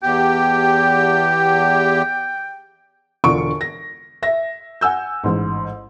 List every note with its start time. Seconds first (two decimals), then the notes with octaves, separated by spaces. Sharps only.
0.03 E2 G4 G5
3.24 E1 D3 F4 C#6 D7
3.61 A#6
4.22 E5 A#6
4.81 F#5 G#5 E6 G6
5.24 A1 G#2